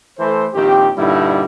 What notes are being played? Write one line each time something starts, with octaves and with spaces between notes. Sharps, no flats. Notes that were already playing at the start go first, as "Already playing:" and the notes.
E3 A3 A4 C5
A#1 D#3 C4 G4
G2 A#2 D3 G3 D#4 E4